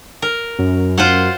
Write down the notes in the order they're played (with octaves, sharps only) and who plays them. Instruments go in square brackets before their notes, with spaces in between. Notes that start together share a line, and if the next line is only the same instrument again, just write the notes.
[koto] A#4
[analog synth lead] F#2
[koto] F4 C5 F#5